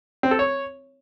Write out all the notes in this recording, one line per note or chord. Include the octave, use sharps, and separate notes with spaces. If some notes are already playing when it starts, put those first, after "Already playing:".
C4
A4
C#5